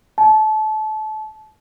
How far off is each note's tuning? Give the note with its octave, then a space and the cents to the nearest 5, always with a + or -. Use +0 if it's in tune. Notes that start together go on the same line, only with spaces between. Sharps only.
A5 -30